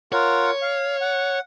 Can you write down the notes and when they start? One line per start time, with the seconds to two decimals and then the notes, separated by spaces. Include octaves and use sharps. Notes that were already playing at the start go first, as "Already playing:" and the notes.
0.13 F4 A#4 C#5 F#5
0.62 F5
1.01 F#5